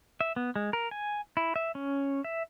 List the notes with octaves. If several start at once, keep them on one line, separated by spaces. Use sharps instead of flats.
E5
B3
G#3
A#4
G#5
E4
E5
C#4
E5